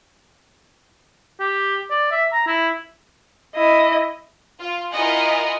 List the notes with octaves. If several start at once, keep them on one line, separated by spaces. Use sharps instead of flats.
G4
D5
E5
A#5
E4
E4 D#5
F4
E4 F4 A#4 D#5 F#5 G#5